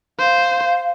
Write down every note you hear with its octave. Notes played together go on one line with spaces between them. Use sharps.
C5 F5